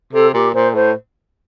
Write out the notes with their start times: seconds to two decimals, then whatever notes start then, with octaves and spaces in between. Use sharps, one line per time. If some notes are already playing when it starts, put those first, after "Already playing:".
0.13 C3 A4
0.33 A#2 G4
0.53 A#2 C5
0.74 A2 C5